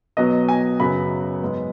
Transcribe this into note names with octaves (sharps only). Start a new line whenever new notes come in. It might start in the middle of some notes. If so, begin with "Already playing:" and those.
B2 F#3 B3 D#5
G#5
F#2 C#3 F#3 B3 B5
G#2 G#3 B3